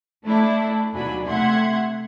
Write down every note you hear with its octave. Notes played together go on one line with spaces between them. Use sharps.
A3 D4 E4
D#2 B2 F#3 D4 G#5 B5
C3 A3 E5 F#5 C6 G#6